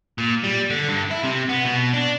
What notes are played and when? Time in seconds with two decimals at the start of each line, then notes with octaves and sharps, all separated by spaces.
0.18 A#2
0.44 G3
0.70 D3
0.88 G2
1.11 E4
1.24 C3
1.50 B3
1.66 B2
1.93 D4